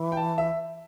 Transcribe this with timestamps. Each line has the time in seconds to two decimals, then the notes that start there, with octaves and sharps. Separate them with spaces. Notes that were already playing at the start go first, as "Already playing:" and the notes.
Already playing: E3
0.12 G5
0.17 A5
0.38 E5